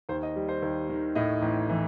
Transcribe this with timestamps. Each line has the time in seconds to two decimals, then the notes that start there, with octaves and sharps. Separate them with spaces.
0.09 D#2 C5
0.23 D#5
0.36 G3
0.49 C5
0.62 D#2
0.89 D#3
1.15 A2 D#5
1.42 A1
1.69 E3